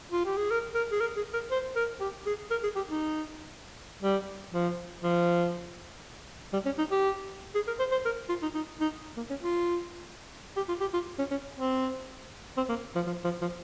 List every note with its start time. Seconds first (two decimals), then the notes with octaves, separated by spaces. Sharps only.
0.12 F4
0.26 G4
0.37 G#4
0.51 A#4
0.75 A#4
0.92 G#4
1.01 A#4
1.16 G#4
1.33 A#4
1.51 C5
1.76 A#4
2.00 G4
2.26 G#4
2.51 A#4
2.63 G#4
2.76 G4
2.89 D#4
4.02 G3
4.53 F3
5.03 F3
6.53 G3
6.66 C#4
6.78 D#4
6.91 G4
7.55 G#4
7.67 A#4
7.79 C5
7.92 C5
8.05 A#4
8.29 F4
8.42 D#4
8.54 D#4
8.80 D#4
9.17 A#3
9.30 C#4
9.43 F4
10.57 G4
10.68 F4
10.81 G4
10.94 F4
11.19 C#4
11.31 C#4
11.57 C4
12.57 C4
12.69 A#3
12.95 F3
13.07 F3
13.24 F3
13.41 F3